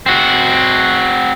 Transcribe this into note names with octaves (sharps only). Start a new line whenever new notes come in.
C4 F#4